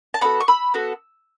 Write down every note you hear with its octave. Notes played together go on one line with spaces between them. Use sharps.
A5
B3 F#4 A4 F#5 B5
C#6
B5 E6
B3 F#4 A4